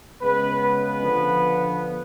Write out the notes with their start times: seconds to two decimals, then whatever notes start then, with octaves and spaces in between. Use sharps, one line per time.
0.21 C#3 G#3 B3 B4
0.61 B4
1.01 D3 F3 B3